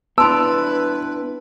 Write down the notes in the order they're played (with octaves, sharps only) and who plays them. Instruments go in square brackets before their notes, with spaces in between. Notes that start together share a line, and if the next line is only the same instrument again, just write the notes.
[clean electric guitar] B3 D4 E4 [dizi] B4 [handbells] A5 C6 [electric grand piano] E6